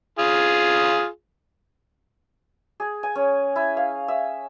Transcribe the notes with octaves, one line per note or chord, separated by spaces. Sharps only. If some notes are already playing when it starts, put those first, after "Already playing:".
F4 G#4
G#4
G#5
C#4
E4
F5
E5